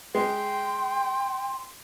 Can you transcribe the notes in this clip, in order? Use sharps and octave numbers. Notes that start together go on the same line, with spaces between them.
G#3 G5 C6